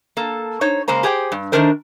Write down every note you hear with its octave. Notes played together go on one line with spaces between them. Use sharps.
A#3 A4
D#4 C5 C#5
C#3 G#3 A#3 C5 A#5
G4 G#4 C5 F#5 G5
G2
D#3 G3 A3 D4 A#4 C5